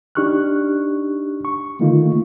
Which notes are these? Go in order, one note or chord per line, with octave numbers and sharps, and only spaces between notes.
D4 D#4 G4 C#6 F6 F#6
C#6
D3 D#3 A3 A#3 D#4 F4